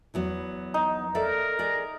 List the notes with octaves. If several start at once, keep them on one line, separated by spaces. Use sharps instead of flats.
E2 F#3 B3
D#4
A4 A#4 D5 E5
G#4 D5